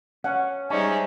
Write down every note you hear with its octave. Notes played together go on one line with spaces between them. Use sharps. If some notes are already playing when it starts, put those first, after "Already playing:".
C#4 F#5
G3 G#3 C#4 D#4 C5 D5 E5